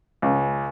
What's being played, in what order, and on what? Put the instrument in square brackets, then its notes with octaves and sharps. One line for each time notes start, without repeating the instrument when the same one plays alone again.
[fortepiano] C#2